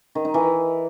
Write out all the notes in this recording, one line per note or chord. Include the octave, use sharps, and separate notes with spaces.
D#3
D#4
E3